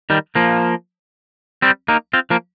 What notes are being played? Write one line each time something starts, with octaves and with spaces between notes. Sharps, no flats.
D#3 G3
F3 A#3
G3 C4
A#3 D#4
C4 F4
F3 A#3